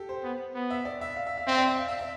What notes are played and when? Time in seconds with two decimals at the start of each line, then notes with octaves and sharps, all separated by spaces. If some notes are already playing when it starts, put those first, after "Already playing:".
Already playing: G4 A4
0.09 C5
0.24 B3
0.55 B3
0.70 E5
0.85 D5
1.01 E5
1.16 F5
1.27 E5
1.38 F5
1.47 C4 E5
1.58 D5
1.68 E5
1.78 F5
1.88 E5
1.99 E5